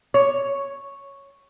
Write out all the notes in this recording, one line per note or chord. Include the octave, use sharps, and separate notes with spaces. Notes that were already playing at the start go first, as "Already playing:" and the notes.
C#5